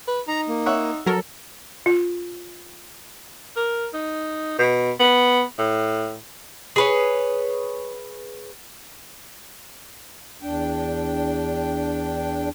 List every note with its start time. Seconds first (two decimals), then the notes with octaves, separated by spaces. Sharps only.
0.08 B4
0.28 D#4 A#5
0.48 A#3
0.66 C#5 E5 F#5
1.06 F#3 A4 A#4
1.86 F4
3.56 A#4
3.94 D#4
4.59 B2
5.00 B3
5.58 A2
6.76 G#4 B4 C#5
10.42 E2 D4 G5